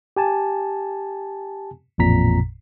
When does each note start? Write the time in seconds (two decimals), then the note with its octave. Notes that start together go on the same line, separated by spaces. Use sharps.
0.17 G4 G#5 A5
1.98 A1 F2 A#2 A#5 B6